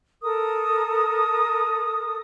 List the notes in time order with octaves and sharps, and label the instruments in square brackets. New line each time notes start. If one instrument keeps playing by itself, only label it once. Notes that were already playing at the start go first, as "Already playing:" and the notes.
[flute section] A4 A#4 D#6